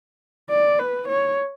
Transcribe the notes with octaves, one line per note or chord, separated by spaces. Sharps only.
D5
B4
C#5